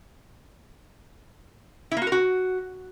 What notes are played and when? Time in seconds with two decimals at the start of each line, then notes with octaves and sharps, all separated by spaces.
1.91 E4
1.97 A#3
2.02 F#4
2.07 A#4
2.12 F#4